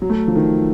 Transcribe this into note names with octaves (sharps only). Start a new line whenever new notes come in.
F#3
A3
F3
D#3